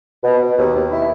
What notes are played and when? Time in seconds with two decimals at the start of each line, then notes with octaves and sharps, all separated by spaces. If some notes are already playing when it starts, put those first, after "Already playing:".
0.24 B2
0.41 B2
0.57 D#2
0.74 D#2
0.90 E4